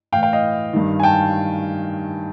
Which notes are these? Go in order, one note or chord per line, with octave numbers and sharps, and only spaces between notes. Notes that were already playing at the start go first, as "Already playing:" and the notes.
A2 E3 F5 G5
F5 G5
D#5 F5
G2 D#3
G#5
G5 A5